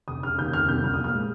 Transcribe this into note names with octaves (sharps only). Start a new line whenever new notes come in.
F1 D#6
C#3 F6
D#2 G6
F1 F6
C2 G6
F3 F6
A#2 D#6
F6
G#3